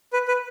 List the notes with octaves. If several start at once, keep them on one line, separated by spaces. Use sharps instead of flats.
B4
B4